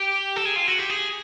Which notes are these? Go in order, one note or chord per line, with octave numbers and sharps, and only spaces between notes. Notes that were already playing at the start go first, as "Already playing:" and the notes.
Already playing: G4
A4
G#4
F4
F#4
G4
G#4